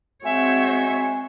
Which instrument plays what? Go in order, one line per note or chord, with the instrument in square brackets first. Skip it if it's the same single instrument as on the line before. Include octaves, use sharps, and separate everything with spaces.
[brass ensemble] G#3 F#4 C5 [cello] C4 C#5 [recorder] E5 [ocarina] G#5